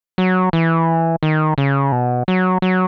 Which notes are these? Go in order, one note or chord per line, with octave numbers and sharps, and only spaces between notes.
F#3
E3
D#3
C#3
B2
F#3
F#3